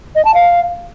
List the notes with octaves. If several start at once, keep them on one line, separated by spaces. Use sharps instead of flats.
D#5
A5
F5